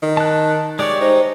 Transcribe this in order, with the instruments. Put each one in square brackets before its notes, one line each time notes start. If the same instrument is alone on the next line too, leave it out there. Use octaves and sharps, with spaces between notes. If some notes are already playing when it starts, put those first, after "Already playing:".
[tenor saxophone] D#3
[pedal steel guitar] A5 F#6
[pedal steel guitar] G#3 G4 C#5 [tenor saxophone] D5
[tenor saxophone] D#4 [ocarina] C5